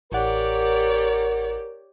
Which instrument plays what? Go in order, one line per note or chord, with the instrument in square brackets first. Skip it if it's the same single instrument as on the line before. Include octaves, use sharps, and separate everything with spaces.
[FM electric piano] A1 F#5 [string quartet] G4 C#5 D5 [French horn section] A#4